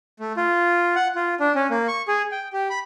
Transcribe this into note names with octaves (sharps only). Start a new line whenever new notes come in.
A3
F4
F#5
F4
D4
C#4
A#3
C#6
G#4
G5
G4
B5